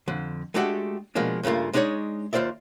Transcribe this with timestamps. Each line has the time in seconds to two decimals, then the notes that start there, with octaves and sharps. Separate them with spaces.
0.08 F2 D3
0.54 G#3 A3 D4 F#4 G4 A4
1.15 B2 F3 G#3 A#3 D4
1.43 G2 C#3 A3 A#3 F4
1.73 G#3 D4 D#4 F#4 C#5 D5
2.33 D#2 F4 C5 D5 E5